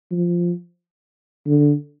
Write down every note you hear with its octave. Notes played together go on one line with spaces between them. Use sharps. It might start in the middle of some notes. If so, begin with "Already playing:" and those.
F3
D3